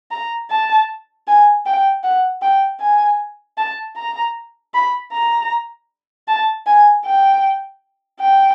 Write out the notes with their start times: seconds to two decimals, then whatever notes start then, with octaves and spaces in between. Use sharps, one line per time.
0.11 A#5
0.50 A5
1.27 G#5
1.66 G5
2.03 F#5
2.42 G5
2.80 G#5
3.58 A5
3.97 A#5
4.74 B5
5.12 A#5
6.28 A5
6.66 G#5
7.06 G5
8.20 G5